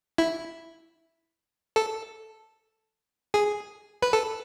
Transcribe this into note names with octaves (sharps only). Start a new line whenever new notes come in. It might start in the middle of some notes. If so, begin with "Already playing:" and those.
E4
A4
G#4
B4
A4